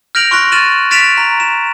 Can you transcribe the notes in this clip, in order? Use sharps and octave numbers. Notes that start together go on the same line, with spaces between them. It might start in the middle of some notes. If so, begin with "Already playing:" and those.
F6 G6 A#6 D7 F7 F#7
C6 C#6 F6 F#6 A#6
F6 A6 D#7 E7 F#7
F6 A6 B6 D7 E7 F7
A#5
E7